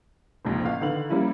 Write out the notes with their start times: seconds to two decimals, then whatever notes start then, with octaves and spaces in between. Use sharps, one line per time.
0.45 A#1 F2 G#2 C3
0.64 A1 F5
0.81 D3 D#3 B3 F5 F#7
1.10 G3 A#3 C#4 E4